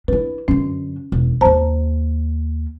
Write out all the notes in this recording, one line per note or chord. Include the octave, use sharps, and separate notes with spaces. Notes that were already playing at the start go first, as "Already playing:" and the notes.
D4 E4 B4
F#2 D3 C#4
E1
D#2 A#3 C5 A5 A#5